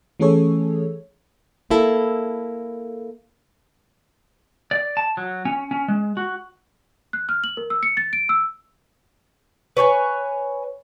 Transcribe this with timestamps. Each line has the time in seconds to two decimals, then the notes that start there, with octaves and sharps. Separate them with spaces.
0.20 E3 A3 C#4 G#4 A4 C#5
1.70 A#3 E4 A4
4.71 D5
4.97 A5
5.17 F#3
5.45 C#4
5.71 C#4
5.88 G#3
6.17 F#4
7.13 F#6
7.29 F6
7.44 F#7
7.57 A#4
7.70 E6
7.83 C#7
7.97 A6
8.13 D7
8.29 E6
9.77 B4 C#5 G5 G#5